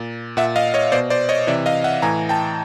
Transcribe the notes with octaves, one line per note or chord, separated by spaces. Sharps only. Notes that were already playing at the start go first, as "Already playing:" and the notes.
Already playing: A#2
A#2 E5 F#5
D#5 F5
C#5 D#5
B2 C5 D5
C5 D5
C#5 D#5
C3 E3 D5 E5
D#5 F5
E5 F#5
A2 E3 G#5 A#5
G5 A5